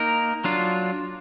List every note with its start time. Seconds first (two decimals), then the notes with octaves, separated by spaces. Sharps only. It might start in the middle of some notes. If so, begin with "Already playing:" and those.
Already playing: A#3 D#4 A#4
0.44 F#3 D4 F4